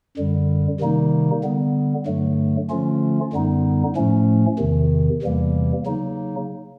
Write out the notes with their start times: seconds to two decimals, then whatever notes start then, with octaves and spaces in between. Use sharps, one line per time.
0.17 F#2 D3 G3
0.80 C3 D#3 G3 A#3 D#4
1.43 D3 G3 B3
2.06 G2 D3 F#3 A3
2.70 D3 F3 A3 C#4 F4
3.33 F#2 D3 G3 B3 D#4
3.96 A2 F3 A3 C#4
4.59 E2 C3 D#3
5.22 E2 C3 E3 G3 A#3
5.86 C#3 F#3 A#3 D#4